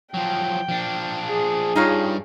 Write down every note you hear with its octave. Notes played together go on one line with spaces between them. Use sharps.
F3 F#3 G5
F3 D4
G#4
G2 D#4 F4 C#5